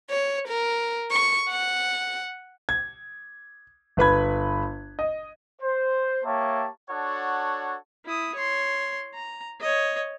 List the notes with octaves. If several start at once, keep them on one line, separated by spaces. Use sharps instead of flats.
C#5
A#4
C#6
F#5
G#6
G1 B4 B5 G#6
D#5
C5
A#3 G4 C#5 E5 A5
D4 F#4 A4 C#5 F#5
E4 D#6
C#5 C6
A#5
C#5 D#5